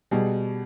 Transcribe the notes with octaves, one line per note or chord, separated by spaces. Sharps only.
B2 G3 G#4